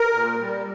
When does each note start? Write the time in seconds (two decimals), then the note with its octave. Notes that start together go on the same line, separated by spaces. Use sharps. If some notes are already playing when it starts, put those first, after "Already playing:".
Already playing: A#4
0.13 A#2
0.40 G3